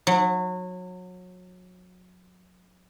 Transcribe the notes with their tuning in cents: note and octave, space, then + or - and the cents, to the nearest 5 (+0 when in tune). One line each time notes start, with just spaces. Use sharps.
F#3 -25